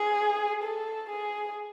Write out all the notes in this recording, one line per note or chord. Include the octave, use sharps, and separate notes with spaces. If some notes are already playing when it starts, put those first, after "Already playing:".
Already playing: G#4
A4
G#4